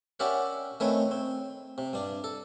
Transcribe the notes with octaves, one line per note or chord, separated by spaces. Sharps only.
C#4 G4 A#4 D5 E5 F#5
D#3 A3 C4 C#4 B4 C#5
C4
C3
G2 D4
A4